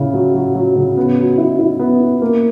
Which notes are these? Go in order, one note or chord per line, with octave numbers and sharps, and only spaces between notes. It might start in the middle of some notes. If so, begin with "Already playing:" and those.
Already playing: C#3 E4
F#3
F#3
F#3
C#3
B3
F#3
E4
E4
B3
E4
A#3